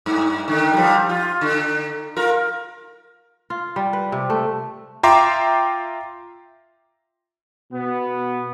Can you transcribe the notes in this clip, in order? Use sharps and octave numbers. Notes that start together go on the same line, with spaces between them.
G2
D3 D#3
F3 G3
F4
D3
F4 A#4
F4
G3
B4
C3
A3
F4 E5 G5 A#5 C6 D6
B2 B3